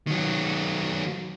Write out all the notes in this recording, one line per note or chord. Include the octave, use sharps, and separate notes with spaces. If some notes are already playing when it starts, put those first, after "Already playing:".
D#3 F#3